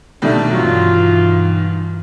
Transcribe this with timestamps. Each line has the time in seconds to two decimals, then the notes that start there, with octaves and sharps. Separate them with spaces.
0.22 B2 D#3 G3 A3 D4
0.51 G2 E3 F#3 F4